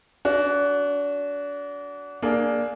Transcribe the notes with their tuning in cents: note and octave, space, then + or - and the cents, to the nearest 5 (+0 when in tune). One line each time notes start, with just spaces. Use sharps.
D4 -35 F#4 +0
A#3 +0 D4 +0 G#4 +15